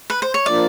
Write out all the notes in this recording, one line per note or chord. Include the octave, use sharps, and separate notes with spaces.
B4
C5
C#5
F3 A#3 D4 F4 D5